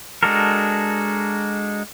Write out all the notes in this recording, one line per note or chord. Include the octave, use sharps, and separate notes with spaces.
G#3 D4 F#4 A4 A#4